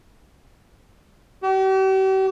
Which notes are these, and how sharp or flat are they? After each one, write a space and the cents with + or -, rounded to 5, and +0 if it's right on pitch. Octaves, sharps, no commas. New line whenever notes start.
G4 -45